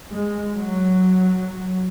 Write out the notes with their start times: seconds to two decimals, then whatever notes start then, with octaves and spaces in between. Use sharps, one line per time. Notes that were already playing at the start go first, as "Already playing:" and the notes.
0.12 G#3
0.54 F#3